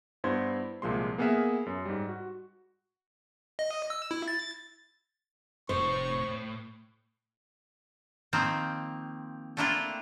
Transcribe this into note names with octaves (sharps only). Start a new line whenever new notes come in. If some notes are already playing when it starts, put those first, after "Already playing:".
G2 B3 E4 C5 C6 G#6
C2 A#2 F3 G#3 C6
A#3 B3 G#4 A#4 E5
F#2
G#2 G3
F#4
D#5
E6
E4
A6
F1 A2 C5 C#6
D#3 F3 A#3 C4
A3 A#3 D4 E4 F4 G5